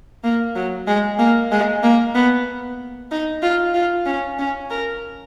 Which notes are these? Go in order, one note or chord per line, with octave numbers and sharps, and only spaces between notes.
A#3
F#3
G#3
A#3
G#3
A#3
B3
D#4
F4
F4
C#4
C#4
A#4